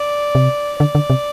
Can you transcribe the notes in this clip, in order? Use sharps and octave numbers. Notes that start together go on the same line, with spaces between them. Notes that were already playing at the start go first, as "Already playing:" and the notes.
Already playing: D5
C3
D3 D5
D3
C3